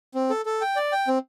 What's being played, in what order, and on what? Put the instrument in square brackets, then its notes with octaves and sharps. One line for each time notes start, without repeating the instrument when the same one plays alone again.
[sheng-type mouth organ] C4
A4
A4
G5
D5
G5
C4